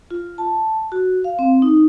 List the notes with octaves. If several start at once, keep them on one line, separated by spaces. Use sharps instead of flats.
F4
A5
F#4
F5
C4
D#4